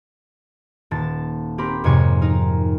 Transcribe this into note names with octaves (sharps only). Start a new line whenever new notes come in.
D#1 A5 A6
C4 G4 A#4 B5
F2 G#2 C3 C#5 G#5 C#6
D#4 A#4